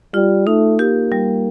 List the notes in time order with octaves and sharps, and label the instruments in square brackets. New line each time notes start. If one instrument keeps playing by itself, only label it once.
[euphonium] G3 [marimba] F4
[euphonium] A3 [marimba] D#4
[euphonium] A#3 [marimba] G4
[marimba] G3